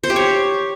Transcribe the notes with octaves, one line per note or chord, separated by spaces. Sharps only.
C5
G4
C#5